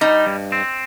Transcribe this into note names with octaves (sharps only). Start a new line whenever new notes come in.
G3 D#4
G2
C4